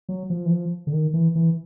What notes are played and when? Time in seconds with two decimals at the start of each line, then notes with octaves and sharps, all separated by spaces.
0.09 F#3
0.30 F3
0.46 E3
0.51 F3
0.87 D3
0.92 D#3
1.14 E3
1.35 E3